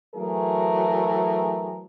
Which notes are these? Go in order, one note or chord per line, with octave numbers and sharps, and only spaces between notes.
E3 F#3 A3 G#4 A#4